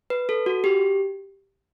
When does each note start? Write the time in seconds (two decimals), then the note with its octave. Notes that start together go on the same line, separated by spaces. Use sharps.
0.10 B4
0.29 A4
0.46 F#4
0.64 G4